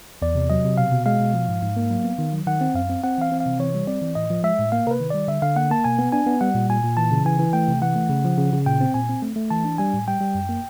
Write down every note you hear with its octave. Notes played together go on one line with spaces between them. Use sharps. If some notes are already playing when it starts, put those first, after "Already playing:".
E2 D5
C3
F#3 D#5
C3
B2 F5
B2
G#3 F5
B2
F3
G#2
G#2
A#3
F#3
B3
D#3
F#3
D#3 F#5
C4
F#2 F5
C4
C4 F#5
E3 F5
C4
F5
C3
E3 C#5
G3
C4 D5
E3
A2 D#5
F3
G#3 E5
A2
A#3 F5
C3 A#4 B4
D#3
G3 D5
D3 E5
D3 F5
A#3 F#5
A#3 A5
B2 G#5
B3
D4 G#5
B3
G3 F#5
A#2
A#2 G#5
A#2
E3 A5
C#3
E3 G#5
E3
A3 G5
C3
E3 F#5
A3
C#3
F3
C#3
C#3
A#2 G5
C4
A#2 G#5
C4
A3
A3
E3 A5
D4
G3 G#5
A2
G3 G5
G3
F#2
A#3